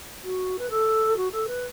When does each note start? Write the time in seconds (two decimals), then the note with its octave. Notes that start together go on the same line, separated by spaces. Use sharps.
0.24 F#4
0.59 B4
0.70 A4
1.16 F#4
1.31 A4
1.47 B4